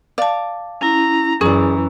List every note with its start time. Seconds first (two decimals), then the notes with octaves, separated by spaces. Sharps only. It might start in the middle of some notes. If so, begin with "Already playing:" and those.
0.18 D5 F5 A5
0.81 C#4 E4 A#5
1.41 F#2 E3 C#4 G#4 D5 A#5